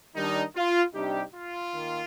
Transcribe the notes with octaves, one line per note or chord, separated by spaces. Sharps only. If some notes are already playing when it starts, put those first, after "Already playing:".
D#3 G3 D4 D#4
F4
C3 G3 D4 D#4 G4
F4
D#3 A#3